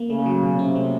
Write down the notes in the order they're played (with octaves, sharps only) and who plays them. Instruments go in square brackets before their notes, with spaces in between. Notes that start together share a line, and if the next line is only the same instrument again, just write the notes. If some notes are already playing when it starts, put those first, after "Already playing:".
Already playing: [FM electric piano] A#3
[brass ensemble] C#3 [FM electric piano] A3
[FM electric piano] F#3
B2
[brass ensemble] C3 [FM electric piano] C#4
[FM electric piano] A3